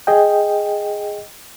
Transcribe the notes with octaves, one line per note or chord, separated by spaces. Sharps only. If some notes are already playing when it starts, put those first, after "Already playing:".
G#4 D#5 G5